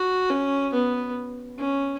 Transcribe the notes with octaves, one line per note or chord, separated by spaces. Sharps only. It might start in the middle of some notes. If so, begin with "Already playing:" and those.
Already playing: F#4
C#4
B3
C#4